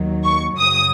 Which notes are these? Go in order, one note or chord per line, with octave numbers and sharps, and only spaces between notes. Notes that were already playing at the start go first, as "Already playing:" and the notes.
Already playing: D#2 D#3 F#3
C#6
F#2 C#3 F#3 D#6